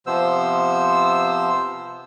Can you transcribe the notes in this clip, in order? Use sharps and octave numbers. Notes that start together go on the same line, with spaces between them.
C3 F3 B3 C5 E6